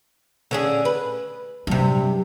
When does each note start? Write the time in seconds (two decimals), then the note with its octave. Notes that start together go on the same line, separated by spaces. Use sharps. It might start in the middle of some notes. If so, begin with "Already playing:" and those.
0.51 D3 C#4 G#4
0.85 B4
1.67 G2 C3 F#3